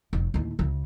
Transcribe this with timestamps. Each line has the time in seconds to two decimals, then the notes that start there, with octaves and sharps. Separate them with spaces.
0.13 F1
0.34 D#2 A2
0.59 C#2 C#3